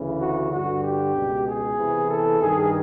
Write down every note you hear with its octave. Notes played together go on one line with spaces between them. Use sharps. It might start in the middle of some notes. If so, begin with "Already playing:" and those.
Already playing: D2 C#3 E3
F#4
G2 D3 F#4
G4
C#2 B2
G#4
E2 C3 E3
A4
G2 D#3 G#4